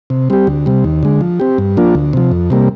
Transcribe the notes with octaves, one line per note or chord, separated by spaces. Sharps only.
C3
G3 C4 G4
D2
C3 G3
D#2
D3 G#3
F3
C4 G4
G2
F3 A#3 D4 F4
D2
C3 F3
F2
C3 G3 A#3